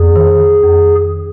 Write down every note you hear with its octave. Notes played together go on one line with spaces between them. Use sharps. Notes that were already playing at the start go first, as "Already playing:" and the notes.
Already playing: F2 G#4
D#3
F2